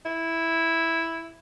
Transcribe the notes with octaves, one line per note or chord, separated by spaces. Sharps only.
E4